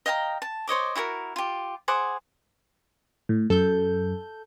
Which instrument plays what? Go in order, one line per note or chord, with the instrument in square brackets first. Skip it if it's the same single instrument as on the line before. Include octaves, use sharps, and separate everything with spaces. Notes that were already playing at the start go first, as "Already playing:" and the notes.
[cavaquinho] D#5 F5 G5 A#5
A5
C5 C#5 D#5 D6
E4 F#4 G4 A#4
F4 G4
G#4 C5 F#5 D6
[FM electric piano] A2
[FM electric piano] F#2 [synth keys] A4 G6